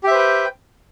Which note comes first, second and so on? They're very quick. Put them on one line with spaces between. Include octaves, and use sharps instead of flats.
G4 E5 C5 B4 G5